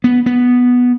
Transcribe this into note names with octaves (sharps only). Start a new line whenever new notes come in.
B3
B3